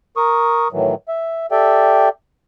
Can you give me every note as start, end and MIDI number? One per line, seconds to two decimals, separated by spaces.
0.17 0.68 70
0.17 0.68 85
0.17 0.68 87
0.72 0.95 45
0.72 0.95 51
0.72 0.95 52
0.72 0.95 54
1.08 1.46 76
1.51 2.09 67
1.51 2.09 69
1.51 2.09 74
1.51 2.09 76
1.51 2.09 79